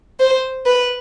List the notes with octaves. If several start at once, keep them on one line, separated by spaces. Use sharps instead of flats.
C5
B4